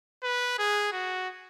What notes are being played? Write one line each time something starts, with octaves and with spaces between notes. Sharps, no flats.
B4
G#4
F#4